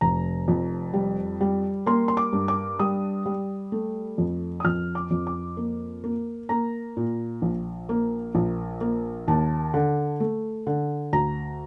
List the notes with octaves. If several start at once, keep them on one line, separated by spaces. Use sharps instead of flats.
F1 A#5
F2
G3
G3
A#3 C6
C6
D6
G2
D6
G3 D#6
G3
A3
F2
D#6
F2 F6
D6
F2
D6
A#3
A#3
A#3 A#5
A#2
A#1
A#3
A#1
A#3
D#2 A5
D3
A3
D3
D2 A#5